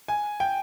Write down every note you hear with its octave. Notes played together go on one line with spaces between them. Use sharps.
G#5
G5